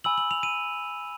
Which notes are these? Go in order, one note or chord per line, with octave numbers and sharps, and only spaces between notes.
G#5 B5 E6 F#7
F#7
F7
D#7